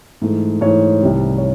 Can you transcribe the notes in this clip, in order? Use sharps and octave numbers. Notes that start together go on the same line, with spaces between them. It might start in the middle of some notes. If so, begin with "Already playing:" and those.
G#2 E3 A3
G#2 E3 A3 C#5
C2 C3 D#3 G3
C#5